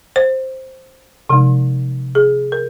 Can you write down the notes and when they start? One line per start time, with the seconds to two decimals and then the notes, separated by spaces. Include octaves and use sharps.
0.16 C5
1.29 C3 F3 G#3 D#4
2.15 G#4
2.52 A#4